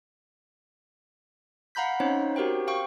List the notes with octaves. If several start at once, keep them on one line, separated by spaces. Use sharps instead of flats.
F5 F#5 A#5 B5 G6 B6
C4 C#4 D#4 C5 C#5
F#4 G4 A#4 C5 G5
F5 G5 C#6